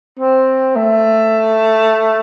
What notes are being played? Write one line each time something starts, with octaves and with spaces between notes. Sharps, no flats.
C4
A3